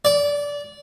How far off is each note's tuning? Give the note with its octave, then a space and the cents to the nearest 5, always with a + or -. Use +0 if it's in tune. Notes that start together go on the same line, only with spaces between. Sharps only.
D5 -20